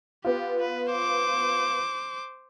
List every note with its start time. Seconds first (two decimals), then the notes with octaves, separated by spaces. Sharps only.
0.24 B3 F4 G4
0.61 B4
0.92 C5 D6